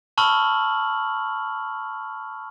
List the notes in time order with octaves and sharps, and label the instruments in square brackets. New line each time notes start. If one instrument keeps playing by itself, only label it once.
[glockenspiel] A5 B5 C#6 E6 F6 F#7